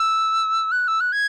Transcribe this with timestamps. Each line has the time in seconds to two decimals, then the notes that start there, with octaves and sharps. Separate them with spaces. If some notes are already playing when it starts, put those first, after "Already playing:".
Already playing: E6
0.72 F#6
0.88 E6
1.00 F#6
1.12 G#6